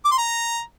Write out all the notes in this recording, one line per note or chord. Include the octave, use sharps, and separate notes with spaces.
D6
C6
A#5